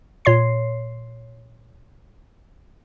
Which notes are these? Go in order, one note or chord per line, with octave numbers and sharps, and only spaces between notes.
A#2 C#5 C6 C7